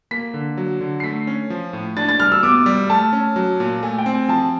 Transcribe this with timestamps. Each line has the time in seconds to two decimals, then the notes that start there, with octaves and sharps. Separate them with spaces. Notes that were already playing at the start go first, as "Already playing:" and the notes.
0.11 A#3 B6
0.34 D3
0.57 F#3
0.81 D3
1.00 C7
1.04 A3 B6
1.27 C#4
1.50 F3
1.73 A2
1.97 D4 A6
2.09 A6
2.20 G3 F6
2.32 E6
2.43 B3 D6
2.66 G3
2.90 A3 A5
3.13 C#4
3.36 F#3
3.60 A#2
3.83 A3 G#5
3.98 G5
4.06 C4
4.14 G#5
4.29 F3 A5